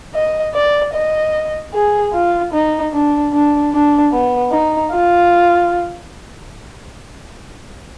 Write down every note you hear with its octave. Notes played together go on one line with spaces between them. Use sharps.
D#5
D5
D#5
G#4
F4
D#4
D4
D4
D4
B3
D#4
F4